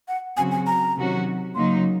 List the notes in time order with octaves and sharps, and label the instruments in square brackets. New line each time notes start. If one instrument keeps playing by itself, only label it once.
[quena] F#5
[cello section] C#3 F#3 C4 F#4 [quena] G#5
[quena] G#5
A#5
[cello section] C3 D#3 F#3 C#4 F#4
[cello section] C#3 F#3 A#3 D#4 [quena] C6